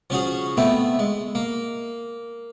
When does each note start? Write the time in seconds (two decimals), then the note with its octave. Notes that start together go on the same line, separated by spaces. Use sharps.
0.10 F3 C#4 F#4 G#4
0.57 A3 B3 C4 E4
0.99 G#3
1.35 A#3